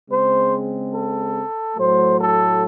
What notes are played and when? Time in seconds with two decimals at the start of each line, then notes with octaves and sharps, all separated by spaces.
0.10 C#3 G#3 C4 C5
0.94 A4
1.77 A2 F#3 A3 C5
2.19 A4